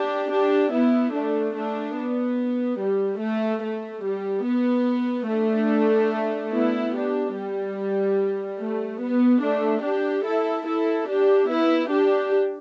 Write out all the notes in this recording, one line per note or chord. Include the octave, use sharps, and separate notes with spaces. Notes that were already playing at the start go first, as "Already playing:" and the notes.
Already playing: D4 G4
D4 G4
B3 E4
A3 D4
A3 D4
B3
G3
A3
A3
G3
B3
A3 D4
B3 E4
D4 G4
G3
A3
B3
A3 D4
D4 G4
E4 A4
E4 A4
D4 G4
B3 E4
D4 G4